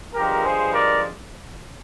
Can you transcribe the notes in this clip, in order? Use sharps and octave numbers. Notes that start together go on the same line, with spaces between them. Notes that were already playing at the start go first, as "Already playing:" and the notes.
G2 F3 G#3 G4 A#4
G#4 C5
A#4 D5